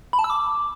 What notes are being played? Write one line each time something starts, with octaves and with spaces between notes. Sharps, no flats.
B5
A5
E6
D6